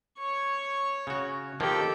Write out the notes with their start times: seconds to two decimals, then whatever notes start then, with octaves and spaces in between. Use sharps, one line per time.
0.19 C#5 C#6
1.07 C#3 F#4
1.60 D#3 F3 A#3 G4 A4